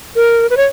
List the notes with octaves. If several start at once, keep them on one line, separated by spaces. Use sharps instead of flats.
A#4
B4
C#5